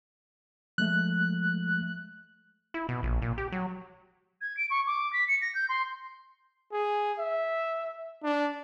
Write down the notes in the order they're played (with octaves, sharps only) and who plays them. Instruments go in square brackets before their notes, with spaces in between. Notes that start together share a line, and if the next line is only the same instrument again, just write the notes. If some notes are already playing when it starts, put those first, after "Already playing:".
[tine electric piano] F3 G#3 A3 [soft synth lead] F#6
[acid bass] E4
B2
A#1
A#2
G4
F#3
[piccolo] G#6
D7
C#6
D6
B6
C#7
A#6
G6
C6
[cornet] G#4
E5
D4